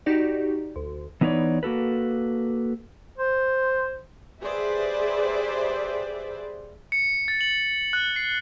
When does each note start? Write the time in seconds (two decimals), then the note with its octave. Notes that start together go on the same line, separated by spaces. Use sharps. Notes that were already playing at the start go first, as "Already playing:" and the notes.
0.06 D#4 F#4 G4 D5
0.76 D2
1.21 E3 B3 D#4 A4 C#5 D5
1.63 A#3 F#4 A4 B4
3.18 C5
4.42 G4 G#4 B4 C5 D5 E5
6.92 C#7
7.28 A6
7.41 F#7
7.93 F#6
8.16 C7